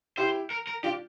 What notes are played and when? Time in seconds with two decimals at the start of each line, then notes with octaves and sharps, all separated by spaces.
0.17 E4 G4 C5
0.50 A#4
0.67 A#4
0.83 D4 F4 G4